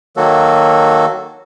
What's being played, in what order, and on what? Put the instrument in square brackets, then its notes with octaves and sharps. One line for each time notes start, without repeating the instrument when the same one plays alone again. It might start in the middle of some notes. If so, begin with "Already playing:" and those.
[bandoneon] D#3 F#3 A#3 F#4 A4